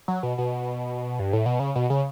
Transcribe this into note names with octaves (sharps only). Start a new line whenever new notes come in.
F#3
B2
B2
G2
A2
B2
C#3
B2
C#3